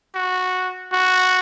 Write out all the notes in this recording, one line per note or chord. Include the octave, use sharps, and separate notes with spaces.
F#4
F#4